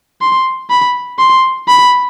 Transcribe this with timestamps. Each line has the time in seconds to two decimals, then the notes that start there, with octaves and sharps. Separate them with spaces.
0.21 C6
0.70 B5
1.19 C6
1.68 B5